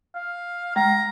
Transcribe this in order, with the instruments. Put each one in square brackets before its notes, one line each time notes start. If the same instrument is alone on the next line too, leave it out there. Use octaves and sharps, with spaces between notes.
[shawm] F5
[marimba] G#3 [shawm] A#5